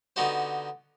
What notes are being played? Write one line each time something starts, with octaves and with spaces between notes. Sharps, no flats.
D3 B3 D#4 F#4 G4 C5